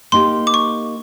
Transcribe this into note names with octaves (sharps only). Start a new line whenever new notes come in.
A#3 D#4 G4 C6
D6
C#6